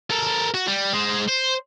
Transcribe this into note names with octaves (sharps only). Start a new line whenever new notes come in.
A4 A#4
F#4
G3
G#3 C5
C5